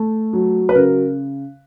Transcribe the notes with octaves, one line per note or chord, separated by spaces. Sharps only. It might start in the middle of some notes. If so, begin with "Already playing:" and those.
Already playing: A3
F#3
B4
C#3 A#4